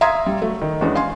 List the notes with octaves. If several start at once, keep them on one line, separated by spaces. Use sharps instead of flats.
E5 F5 A#5 C6 D#6 G#6
G3
F#3 A3
D#3
E2 G#3 B3 C#4 D4
F5 G#5 C6